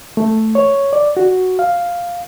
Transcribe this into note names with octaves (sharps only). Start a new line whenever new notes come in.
A3
C#5
D5
F#4
F5